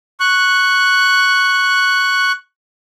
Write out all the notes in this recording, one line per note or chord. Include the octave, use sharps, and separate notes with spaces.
C#6 F#6